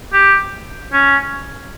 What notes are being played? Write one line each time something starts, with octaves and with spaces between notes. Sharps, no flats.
G4
C#4